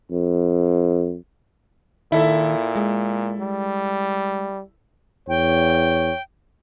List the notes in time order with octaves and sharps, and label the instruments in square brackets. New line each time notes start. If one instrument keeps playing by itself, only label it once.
[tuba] F2
[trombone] A#2 [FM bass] D#3 [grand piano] E4 A4 E5
[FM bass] G#3
[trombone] G3
[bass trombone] E2 [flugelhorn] C#5 [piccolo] G5